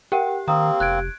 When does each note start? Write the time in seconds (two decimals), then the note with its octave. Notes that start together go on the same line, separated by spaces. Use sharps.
0.12 G4 A#4 F#5 G5
0.48 D#3 A#3 C4 A#5 D#6
0.80 F1 F#6 G#6 D7